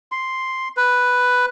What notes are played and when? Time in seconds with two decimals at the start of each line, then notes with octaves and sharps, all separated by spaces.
0.12 C6
0.77 B4